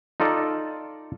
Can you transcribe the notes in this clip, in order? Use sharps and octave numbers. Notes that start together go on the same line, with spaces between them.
D#4 F4 A4 D5